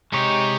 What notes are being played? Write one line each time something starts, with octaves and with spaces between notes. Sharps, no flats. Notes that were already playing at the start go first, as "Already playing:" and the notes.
C3 G#3 D#4 G4 C#5